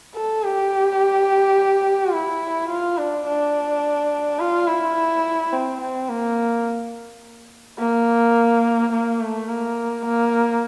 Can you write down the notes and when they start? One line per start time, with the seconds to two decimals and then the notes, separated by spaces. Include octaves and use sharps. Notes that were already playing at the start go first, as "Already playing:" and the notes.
0.15 A4
0.43 G4
2.13 E4
2.69 F4
2.98 D4
3.26 D4
4.39 F4
4.67 E4
5.52 C4
5.81 C4
6.09 A#3
7.79 A#3
8.92 A#3
9.20 A3
9.48 A#3
10.05 A#3